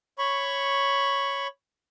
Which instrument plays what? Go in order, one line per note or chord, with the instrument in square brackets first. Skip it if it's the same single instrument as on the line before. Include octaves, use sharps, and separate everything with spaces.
[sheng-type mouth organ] C#5 B5 C#6